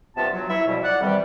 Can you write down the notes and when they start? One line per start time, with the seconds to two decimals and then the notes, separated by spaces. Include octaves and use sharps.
0.17 G2 C3 B3 F4 A5
0.34 F#3
0.49 E4 C#5 E5
0.67 F2 B2 G3
0.83 D5 F#5
1.01 F2 C3 D#3 E3 G3